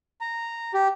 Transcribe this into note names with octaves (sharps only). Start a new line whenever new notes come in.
A#5
G4